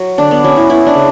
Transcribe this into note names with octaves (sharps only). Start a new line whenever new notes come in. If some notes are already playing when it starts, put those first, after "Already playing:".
Already playing: F#3
D3 D4
B3
F#3 C#4
E4
B3 E4
D4
C#3